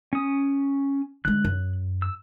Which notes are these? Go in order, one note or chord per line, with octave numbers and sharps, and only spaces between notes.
C#4 D#6
D3 G#3 F#6
F#2
E6